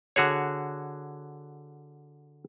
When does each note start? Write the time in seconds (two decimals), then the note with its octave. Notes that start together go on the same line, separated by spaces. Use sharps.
0.16 D3 F#4 G#4 C#5